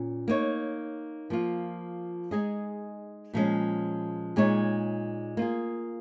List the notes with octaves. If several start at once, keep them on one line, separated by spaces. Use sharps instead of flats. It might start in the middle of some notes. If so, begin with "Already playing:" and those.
Already playing: A#2 C#4
A#3 D#4 C#5
F3 A#3 F4
G#3 D#4 G#4 D#5
A#2 F3 G#3 C#4
A#2 G#3 D#4 C#5
A#3 F4 G#4